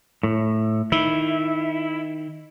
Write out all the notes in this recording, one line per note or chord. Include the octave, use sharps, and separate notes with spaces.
A2
D#3 E4